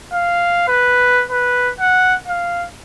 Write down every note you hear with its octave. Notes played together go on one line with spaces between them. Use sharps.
F5
B4
B4
F#5
F5